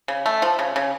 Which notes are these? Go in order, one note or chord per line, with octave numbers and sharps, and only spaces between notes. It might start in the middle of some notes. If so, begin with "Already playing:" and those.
C#3
A3
F3
C#3
C#3